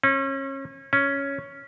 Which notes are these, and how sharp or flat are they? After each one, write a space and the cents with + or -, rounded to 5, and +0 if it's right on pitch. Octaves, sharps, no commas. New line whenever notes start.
C#4 -30
C#4 +5